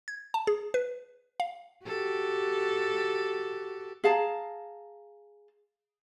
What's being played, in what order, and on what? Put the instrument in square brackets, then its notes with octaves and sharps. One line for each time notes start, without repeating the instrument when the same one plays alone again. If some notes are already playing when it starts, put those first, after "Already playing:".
[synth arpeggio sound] G#6
A5
G#4
B4
F5
[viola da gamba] F#4 G4 A4
[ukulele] G#4 F5 A5 A#5